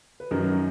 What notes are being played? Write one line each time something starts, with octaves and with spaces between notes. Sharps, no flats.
B4
F#2 D#3 F#3 A#4